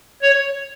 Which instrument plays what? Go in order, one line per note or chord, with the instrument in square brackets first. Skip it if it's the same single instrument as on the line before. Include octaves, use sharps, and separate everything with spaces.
[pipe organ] C#5